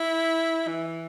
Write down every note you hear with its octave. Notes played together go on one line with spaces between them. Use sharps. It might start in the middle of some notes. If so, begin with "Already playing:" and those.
Already playing: E4
E3